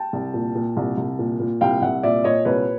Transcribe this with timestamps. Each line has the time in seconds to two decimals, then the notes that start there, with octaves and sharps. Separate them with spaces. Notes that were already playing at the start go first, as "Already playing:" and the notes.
Already playing: G5 A5
0.13 C2
0.34 A#2
0.55 A#2
0.77 C2
0.97 C2
1.19 A#2
1.40 A#2
1.61 C2 F5 G5
1.82 C2 E5 F#5
2.03 A#2 D5 E5
2.24 A#2 C#5 D#5
2.45 C2 B4 C#5